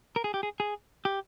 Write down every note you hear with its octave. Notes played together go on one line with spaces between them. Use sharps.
A#4
G#4
G4
G#4
G#4
G4